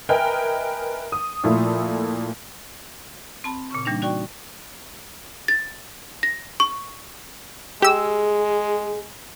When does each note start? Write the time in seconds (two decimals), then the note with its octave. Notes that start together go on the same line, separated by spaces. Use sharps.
0.09 A#4 B4 D#5 E5 G5 G#5
1.12 D#6
1.44 A#2 F3 A3 E4 F4
3.44 C4 A5 B5
3.71 A#2 C#3 C#6
3.85 E3 G3 A#3 D4 D#4
4.02 D#4 F#4 D5 G5 C#6
5.48 A6
6.23 A#6
6.60 C#6
7.82 G#3 G4 G#4 E6